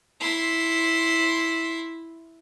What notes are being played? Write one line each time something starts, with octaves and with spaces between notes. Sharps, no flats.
E4 C6